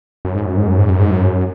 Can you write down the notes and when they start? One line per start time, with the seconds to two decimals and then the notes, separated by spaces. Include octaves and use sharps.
0.25 F#2
0.35 G#2
0.46 F#2
0.58 G#2
0.68 F#2
0.79 G#2
0.89 F#2
1.00 G#2
1.11 F#2